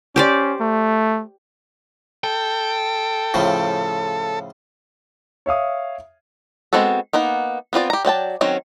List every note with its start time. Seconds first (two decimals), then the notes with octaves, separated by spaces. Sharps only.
0.16 C#4 G4 C5 D5
0.61 A3
2.24 A4 G5
3.34 A2 C#3 F3
5.46 C#5 E5 F5 D#6
6.73 G#3 B3 C4 F#4 A4
7.13 A#3 B3 D#4 F#5
7.73 B3 C4 F4 D5
7.90 G4 A#5
8.05 F#3 D5 G5 A5
8.41 D#3 F#3 C4 C#4